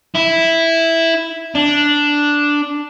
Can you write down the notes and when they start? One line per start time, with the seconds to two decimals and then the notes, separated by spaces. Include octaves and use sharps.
0.15 E4
1.55 D4